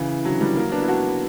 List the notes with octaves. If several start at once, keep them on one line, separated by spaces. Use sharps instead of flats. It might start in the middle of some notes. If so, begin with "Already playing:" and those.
Already playing: C#3 E3
D3 F#3
E3 G3
F#3 A#3
B3 D4
E4
D4 F#4